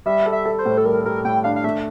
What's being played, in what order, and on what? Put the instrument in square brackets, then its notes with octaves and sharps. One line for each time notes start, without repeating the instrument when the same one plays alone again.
[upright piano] G3 [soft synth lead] E5
[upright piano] A4
[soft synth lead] E5
[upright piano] A4
[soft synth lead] C5
[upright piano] A2
[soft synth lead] A4
[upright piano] G3 [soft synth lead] A#4
[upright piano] G3 [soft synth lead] A#4
[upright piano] A2 [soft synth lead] G5
[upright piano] D4 [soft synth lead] F5
[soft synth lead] F5
[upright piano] A3 [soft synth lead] E5